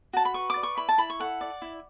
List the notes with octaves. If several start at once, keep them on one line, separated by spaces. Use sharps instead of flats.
F#4 A5
B5
B4 C#6
D6
D5
C#6
E4 B5
A5
E4 B5
C#6
A4 F#5
D5
E4